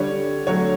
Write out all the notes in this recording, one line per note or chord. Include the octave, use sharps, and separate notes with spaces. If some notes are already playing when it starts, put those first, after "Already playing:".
Already playing: D3 G3 C#5
D3 F#3 A3 C#5